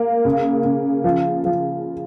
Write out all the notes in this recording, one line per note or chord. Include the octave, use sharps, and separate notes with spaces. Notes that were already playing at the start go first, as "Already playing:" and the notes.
Already playing: A#3
C#3
C#3
F3
F3